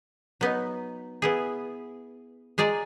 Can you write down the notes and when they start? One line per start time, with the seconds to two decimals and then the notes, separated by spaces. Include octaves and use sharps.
0.41 F#3 B3 D#4
1.22 B3 E4 G#4
2.58 G#3 G#4 D5 A#5